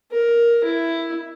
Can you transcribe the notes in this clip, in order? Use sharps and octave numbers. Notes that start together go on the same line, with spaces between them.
A#4
E4